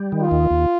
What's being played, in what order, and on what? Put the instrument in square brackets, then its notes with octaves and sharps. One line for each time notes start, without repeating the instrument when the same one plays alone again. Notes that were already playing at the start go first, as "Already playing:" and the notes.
Already playing: [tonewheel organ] G3
D#3
[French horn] F4
[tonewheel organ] D#2
D#2